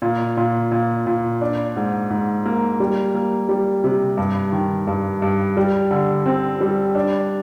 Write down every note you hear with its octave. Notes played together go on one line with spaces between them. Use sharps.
A#2
A#2
A#2
A#2
D4
G#2
G#2
A#3
G3
A#3
G3
C3
G2
D#3
G2
G2
G3
D3
C4
G3
D4